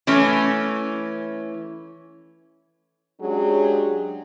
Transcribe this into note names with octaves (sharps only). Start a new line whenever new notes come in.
E3 A3 C#4
F#3 G#3 C#4 D4 G4 G#4